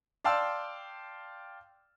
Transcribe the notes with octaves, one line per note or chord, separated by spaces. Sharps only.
D5 F5 G5 A5 C6 E6